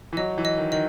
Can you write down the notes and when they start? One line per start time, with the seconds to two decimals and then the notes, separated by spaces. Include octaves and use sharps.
0.13 E3
0.17 F#3 D#5
0.38 E3
0.45 D#5
0.58 D#3
0.72 D#3 D#5